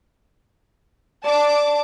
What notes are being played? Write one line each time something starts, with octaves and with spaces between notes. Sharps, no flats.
D5 A5 D6